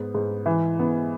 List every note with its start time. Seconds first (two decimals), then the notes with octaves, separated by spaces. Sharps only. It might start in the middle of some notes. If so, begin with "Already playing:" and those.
Already playing: G#2 B3
0.15 G#2
0.46 E3
0.79 B3